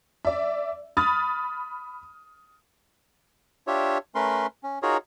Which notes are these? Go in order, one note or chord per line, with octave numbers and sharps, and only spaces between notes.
D5 E5
B5 D#6 F6 A6
D4 F4 G4 C#5 E5
A3 C#4 A#4 B4 C6
C#4
D#4 F4 F#4 G#4 A#4 C#5